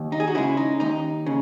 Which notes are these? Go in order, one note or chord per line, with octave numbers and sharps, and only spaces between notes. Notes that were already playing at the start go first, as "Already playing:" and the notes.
Already playing: D#2
D#4
G#4
F#4
C#3 G#3 E4
D#4
D#2 D#4
C#3